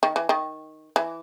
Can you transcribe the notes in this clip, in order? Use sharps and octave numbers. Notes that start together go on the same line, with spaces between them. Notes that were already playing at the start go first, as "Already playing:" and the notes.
D#3
E3
D#3
E3